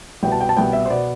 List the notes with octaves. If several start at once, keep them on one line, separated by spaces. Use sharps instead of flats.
C2 B2 B3 G5
A5
G5
A5
C2 B2 B3 G5
E5
C5
B2 B3 D5